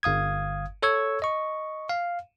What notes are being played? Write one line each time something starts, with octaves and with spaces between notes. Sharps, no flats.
G1 F5 D#6 G#6
A4 C#5 C#6 E6 G#6
D#5 C#6
F5